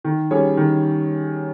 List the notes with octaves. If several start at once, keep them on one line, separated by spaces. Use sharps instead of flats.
D#3
G3 C#4 G#4 C#5
D#3